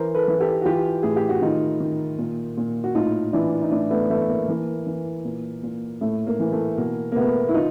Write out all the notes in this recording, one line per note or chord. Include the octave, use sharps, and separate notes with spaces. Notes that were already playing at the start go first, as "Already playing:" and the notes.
Already playing: E3 A#4 C5
A4 B4
E3
G4 A4
F#4
E3 F4 G4
A2 G#4
G4
F#4
D#3 D#4 F4
D#3
A#2
A#2
F#4
A2 D#4 F4
E3 D4 E4
D#4
A2 D4 E4
A3 B3
E3 A3 B3
A#3
E3 A#3
E3
A#2
A#2
A2 A3
A#3
E3
A3
B2 A#3
A#3
B2 A3 B3
E4
D#3 D#4 F4